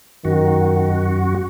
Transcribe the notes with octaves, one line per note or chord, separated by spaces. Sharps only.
F#2 D#3 F#4